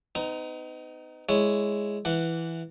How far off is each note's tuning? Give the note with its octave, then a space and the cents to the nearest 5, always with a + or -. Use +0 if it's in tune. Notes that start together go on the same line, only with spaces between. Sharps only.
B3 +45 D#4 +0
G#3 +0 E4 +0 C#5 +0
E3 +5 F#5 +0